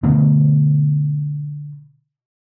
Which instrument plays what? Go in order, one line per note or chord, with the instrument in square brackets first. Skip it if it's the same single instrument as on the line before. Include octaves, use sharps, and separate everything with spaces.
[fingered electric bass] B2 D3 A3 B3